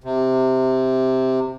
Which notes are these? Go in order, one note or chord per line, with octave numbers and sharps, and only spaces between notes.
C3